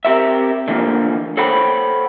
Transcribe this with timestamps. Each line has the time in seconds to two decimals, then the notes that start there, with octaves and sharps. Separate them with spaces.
0.05 C4 G4 A#4 E5
0.68 D3 E3 F3 A#3
1.37 A4 C5 C#5 F#5 G5 B5